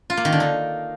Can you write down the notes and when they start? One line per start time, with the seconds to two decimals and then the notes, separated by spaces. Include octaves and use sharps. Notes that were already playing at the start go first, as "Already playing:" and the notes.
0.10 F4
0.17 A#3
0.25 D#3
0.32 D3
0.40 D#4